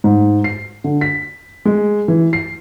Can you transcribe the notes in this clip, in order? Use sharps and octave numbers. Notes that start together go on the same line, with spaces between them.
G#2
C7
D3
B6
G#3
E3
C7